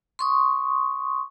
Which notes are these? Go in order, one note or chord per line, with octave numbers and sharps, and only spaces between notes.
C6 C#6 D#6